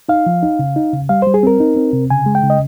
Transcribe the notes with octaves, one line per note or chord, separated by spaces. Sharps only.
D#4 F5
F3
D#4
C#3
D#4
C#3
G3 F5
G3 C5
G#4
C4 A#4
D#4
C4
C3
C#3 G#5
G#3
G5
C#3
D#5